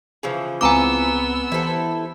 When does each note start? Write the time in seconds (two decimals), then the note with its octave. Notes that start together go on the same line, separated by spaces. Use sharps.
0.23 C#3 E3 F3
0.61 C#2 G#3 B3 C4 G#5 A#5 D6 E6
1.52 E3 E4 G4 A4 C5